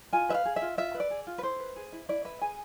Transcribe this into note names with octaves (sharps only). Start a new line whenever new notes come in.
F4 G#5
B4 E5
F5
G#4
E5
F4
F4 E5
B4
D5
G#4
F4
B4
E4 C5
B4
G#4
E4
E4 D5
B4 E5
G#4 G#5